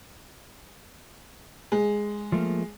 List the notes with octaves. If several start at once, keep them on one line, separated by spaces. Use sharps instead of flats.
G#3
F3 A3 A#3